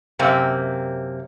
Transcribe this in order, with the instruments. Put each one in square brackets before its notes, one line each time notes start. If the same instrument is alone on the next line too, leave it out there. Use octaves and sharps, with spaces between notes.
[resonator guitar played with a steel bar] F#2 C3 A#3 C4